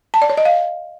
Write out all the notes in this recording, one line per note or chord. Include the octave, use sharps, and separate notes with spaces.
A5
D5
C#5
D#5
F5